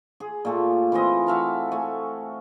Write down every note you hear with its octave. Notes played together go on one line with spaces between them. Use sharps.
G#4
A#2 A3 G4
E3 C4 F4 D#5
F#4 E5 F5 A5
A3 G#5